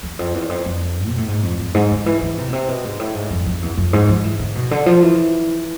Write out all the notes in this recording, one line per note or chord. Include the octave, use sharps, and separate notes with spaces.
E2
F2
E2
F2
F2
B2
A2
G#2
F2
F2
G#2
D3
E3
E3
C3
B2
C3
B2
G#2
A2
G#2
F2
F2
E2
F2
G#2
F3
E3
D3
B2
D3
F3
E3